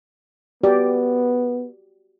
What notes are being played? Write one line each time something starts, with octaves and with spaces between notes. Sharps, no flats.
B3 F#4 G4 D5